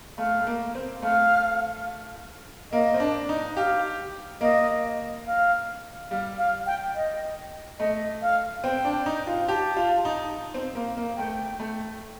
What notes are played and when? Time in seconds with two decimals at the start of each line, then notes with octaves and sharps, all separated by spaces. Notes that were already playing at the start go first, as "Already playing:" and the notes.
0.18 A3 F5
0.41 A3
0.47 A#3
0.75 C4
1.02 A3 F5
2.72 A#3 D#5
2.94 C4
3.00 D4
3.29 D#4
3.56 G4 F5
4.41 A#3 D#5
5.26 F5
6.10 G3 F5
6.38 F5
6.66 G5
6.95 D#5
7.79 A3 D#5
8.22 F5
8.64 C4 G5
8.85 D4
9.06 D#4
9.27 F4
9.48 G4 A5
9.77 F4
10.05 D#4
10.54 C4
10.75 A#3
10.97 A#3
11.17 A3 G5
11.60 A3